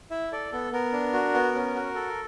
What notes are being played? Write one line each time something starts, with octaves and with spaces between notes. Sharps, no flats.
E4 E5
A4 D5
B3 A4
B3 A#4
D4
F#4
B3
C#4
F#4
A4